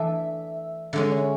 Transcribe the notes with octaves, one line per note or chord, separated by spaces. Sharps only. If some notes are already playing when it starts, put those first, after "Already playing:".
Already playing: E3 A3 D4 E5
D3 G#3 C#4 E5
C#5